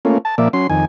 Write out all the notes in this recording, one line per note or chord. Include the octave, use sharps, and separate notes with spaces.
A3 A#3 C#4 F4
A5
A#2 F3 A#3 D5 E5
F#3 C#4 C6
F2 D#3 G#5